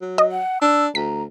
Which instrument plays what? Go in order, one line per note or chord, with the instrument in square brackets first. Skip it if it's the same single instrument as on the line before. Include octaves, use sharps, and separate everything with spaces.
[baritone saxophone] F#3
[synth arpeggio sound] D#5
[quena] F#5
[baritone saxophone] D4 [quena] E6
[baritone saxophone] D2 [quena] A#5 [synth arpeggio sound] B6